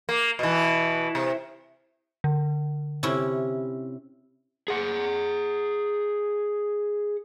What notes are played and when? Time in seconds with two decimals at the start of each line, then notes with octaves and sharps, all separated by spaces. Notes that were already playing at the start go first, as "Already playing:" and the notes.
0.09 A#3
0.39 B2 E3
1.15 C3
2.24 D3
3.03 C3 C#4 E4
4.68 G#4 F#5